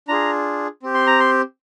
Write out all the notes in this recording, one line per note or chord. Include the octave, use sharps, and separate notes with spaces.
D4 F4 G#4 A#5
C4 G4
C6
A#5
C6